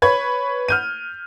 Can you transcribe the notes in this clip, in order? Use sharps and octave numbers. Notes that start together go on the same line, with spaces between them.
B4 C#5 B5 G#6
F6 G6 D#7